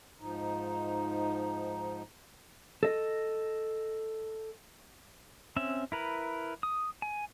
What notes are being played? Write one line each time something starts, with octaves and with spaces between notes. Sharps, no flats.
G#2 F3 D#4
A4 D#5
C4 C#4 E5
E4 A#4 B4
D#6
G#5